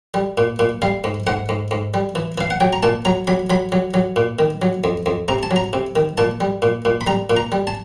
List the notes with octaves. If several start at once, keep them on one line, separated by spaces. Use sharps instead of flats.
G3
A#2
A#2
G3 F5
G#2
G#2 F#5
G#2
G#2
G3
E3
E3 F5
F#5
F#3 G5
A#5
A#2 A5
F#3 A#5
F#3 B5
F#3 B5
F#3
F#3
A#2
D#3
F#3
F2
F2
C3 A#5
A5
F#3
A#5
C3
D#3
A#2 A5
G3
A#2
A#2
B5
G3 A#5
A#2
A#5
G3
A5